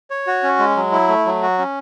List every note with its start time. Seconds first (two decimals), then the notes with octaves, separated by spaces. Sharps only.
0.10 C#5
0.27 F#4
0.43 C#4
0.59 G#3
0.76 F#3
0.92 E4
1.09 A3
1.26 F#3
1.42 F#4
1.58 C#4